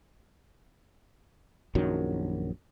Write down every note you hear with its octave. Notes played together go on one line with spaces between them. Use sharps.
A#1 F#2 D#3 F#3